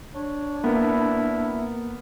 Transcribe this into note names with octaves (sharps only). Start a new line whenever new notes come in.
D4 C#5
A#3 B3 E4 A#4